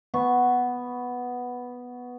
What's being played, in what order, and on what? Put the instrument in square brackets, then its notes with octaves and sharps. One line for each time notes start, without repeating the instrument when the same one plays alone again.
[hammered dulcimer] B3 C#6